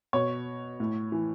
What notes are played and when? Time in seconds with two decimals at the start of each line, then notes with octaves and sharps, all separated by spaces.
0.13 B2 C#5
0.80 A2
1.12 E3